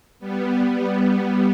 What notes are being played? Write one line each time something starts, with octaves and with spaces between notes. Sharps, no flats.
G3 B3